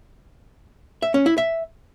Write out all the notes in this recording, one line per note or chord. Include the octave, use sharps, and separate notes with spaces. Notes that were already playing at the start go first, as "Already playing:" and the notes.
E5
C#4
E4
E5